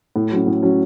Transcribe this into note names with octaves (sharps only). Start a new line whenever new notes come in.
A2
F#3 C#4
A2
F#3 C#4